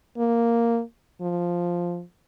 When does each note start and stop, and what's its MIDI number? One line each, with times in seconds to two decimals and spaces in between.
0.17 0.81 58
1.21 2.02 53